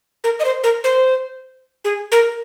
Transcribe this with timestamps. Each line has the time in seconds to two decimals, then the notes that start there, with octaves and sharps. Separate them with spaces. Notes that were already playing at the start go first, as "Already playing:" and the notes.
0.24 A#4
0.40 D#5
0.45 C5
0.64 A#4
0.84 C5
1.85 G#4
2.12 A#4